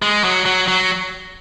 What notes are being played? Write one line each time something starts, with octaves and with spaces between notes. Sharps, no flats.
G#3
F#3
F#3
F#3